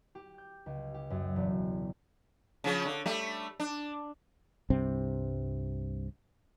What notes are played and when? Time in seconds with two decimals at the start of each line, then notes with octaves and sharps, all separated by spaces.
0.15 G4
0.38 G6
0.66 C#2
0.94 G4
1.10 F#2
1.36 E1
2.64 C#3 F3 C#4
2.86 D3
3.06 G3 A3
3.60 D4
4.70 C2 G2 C3 C4